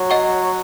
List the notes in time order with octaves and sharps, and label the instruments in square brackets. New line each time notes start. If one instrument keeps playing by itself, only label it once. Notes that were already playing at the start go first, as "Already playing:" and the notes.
Already playing: [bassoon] F#3
[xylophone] D#5 F#5 C#6